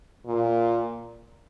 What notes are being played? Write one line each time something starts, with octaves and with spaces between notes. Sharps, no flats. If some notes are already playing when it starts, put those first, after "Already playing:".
A#2